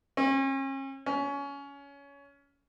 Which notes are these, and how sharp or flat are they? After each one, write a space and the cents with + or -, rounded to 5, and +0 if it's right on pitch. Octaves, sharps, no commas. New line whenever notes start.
C#4 -40
C#4 +20